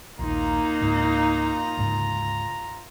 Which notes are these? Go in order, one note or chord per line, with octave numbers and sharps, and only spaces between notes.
A#1 D#2 A#3 D#4 F4 A#5
C#2 G#2
D2 G#2 C#3